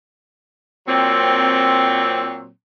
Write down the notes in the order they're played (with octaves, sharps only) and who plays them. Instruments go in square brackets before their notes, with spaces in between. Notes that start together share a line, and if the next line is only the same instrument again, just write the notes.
[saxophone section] A#2 F#3 C4